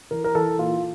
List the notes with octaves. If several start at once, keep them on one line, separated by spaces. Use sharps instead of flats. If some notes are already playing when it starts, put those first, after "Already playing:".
E3 A#4
A#4
E3 A4
A#2 F4